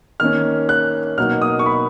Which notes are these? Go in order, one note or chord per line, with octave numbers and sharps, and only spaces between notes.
D#3 A#3 C#4 F6
F#6
B2 F#3 A#3 D#4 F6
D#6
C#6
B5